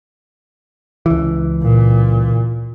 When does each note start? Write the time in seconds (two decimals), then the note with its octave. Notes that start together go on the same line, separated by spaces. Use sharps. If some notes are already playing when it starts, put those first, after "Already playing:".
1.06 C#2 E3
1.62 A#2